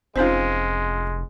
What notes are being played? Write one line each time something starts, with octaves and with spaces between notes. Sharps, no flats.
F1 G#3 C4 C#4 D#4 F4 C5